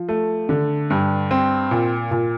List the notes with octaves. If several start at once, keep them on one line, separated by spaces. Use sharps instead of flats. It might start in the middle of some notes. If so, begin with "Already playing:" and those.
Already playing: F3
A3
D3
G2
C4
A#2
A#2